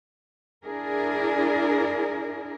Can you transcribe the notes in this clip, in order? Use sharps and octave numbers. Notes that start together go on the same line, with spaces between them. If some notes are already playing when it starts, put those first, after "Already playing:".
D4 E4 G#4 A#4